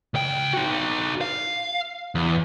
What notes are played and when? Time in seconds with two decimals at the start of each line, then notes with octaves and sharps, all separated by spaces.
0.14 C#2 G5
0.53 D#4 F#4
1.21 F5
2.15 E2